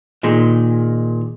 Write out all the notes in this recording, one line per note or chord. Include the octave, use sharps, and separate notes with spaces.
A#2 D#3 G#3